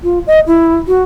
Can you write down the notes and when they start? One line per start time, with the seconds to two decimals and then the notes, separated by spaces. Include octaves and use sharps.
0.04 F4
0.27 D#5
0.47 E4
0.88 F#4